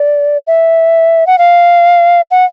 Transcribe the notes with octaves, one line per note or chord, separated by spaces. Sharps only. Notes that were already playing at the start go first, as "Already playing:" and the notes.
Already playing: D5
E5
F#5
F5
F#5